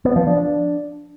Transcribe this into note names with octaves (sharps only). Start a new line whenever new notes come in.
B3
F3
D4